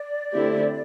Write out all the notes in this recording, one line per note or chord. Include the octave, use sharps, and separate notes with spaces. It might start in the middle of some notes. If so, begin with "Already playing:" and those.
Already playing: D5
D3 A3 C4 E4 G4